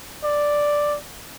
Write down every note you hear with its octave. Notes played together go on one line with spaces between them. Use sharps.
D5